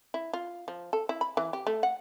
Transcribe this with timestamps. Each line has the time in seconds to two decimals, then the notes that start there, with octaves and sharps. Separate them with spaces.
0.14 E4
0.33 F4
0.68 F3
0.93 A4
1.09 E4
1.21 B5
1.37 E3
1.53 G4
1.67 A3
1.83 F#5